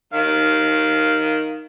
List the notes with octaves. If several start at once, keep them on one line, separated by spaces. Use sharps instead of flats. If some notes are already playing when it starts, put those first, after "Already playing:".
D#3 F5